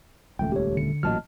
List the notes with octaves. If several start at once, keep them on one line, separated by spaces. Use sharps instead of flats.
D#1 C#2 A3 G5
G4 C#5
D3 C#7
A1 A#2 F#3 D#5 A5 F6